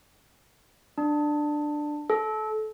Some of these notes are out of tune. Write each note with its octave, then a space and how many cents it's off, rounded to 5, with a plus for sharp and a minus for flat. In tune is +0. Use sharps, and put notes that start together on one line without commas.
D4 +15
A4 -25